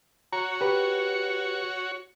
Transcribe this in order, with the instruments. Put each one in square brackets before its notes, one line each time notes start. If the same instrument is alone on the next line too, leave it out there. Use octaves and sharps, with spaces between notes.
[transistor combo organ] F#4 C#5 [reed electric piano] A#5
[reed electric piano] G4 B4